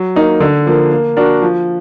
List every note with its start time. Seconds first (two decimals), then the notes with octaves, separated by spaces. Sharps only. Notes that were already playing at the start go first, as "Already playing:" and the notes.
Already playing: F#3
0.16 A#3 D#4
0.40 D3
0.66 F3 A#3
0.92 A#3
1.17 D4 F#4 A#4
1.42 F3